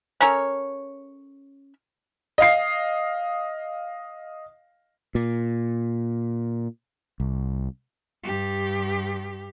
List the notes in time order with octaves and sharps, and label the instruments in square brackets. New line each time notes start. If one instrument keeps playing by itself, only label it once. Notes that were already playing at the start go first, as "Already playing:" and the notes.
[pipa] C#4 A4 A#4 C#5
[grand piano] D#5 F5 C7
[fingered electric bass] A#2
C2
[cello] G2 G4